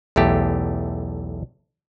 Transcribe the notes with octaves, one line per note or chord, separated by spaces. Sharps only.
B1 E2 A3 G4